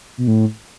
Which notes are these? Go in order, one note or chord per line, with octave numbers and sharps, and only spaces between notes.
B2
A2